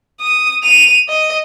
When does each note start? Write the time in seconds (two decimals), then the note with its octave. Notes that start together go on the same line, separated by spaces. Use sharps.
0.21 D#6
0.63 D#7 F7
1.08 D#5